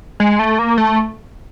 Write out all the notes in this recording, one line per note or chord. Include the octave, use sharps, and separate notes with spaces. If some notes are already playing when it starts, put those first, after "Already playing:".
G#3
A3
A#3
A3